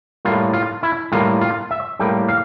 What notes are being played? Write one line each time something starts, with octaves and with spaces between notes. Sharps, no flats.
A2 G3 A#3 F4
F4
E4
A2 G3 A#3 F4
F4
E5
A2 G3 A#3 G5
F5